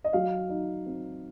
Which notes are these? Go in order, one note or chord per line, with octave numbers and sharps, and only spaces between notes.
D#5
F#3 F5
D#4
C4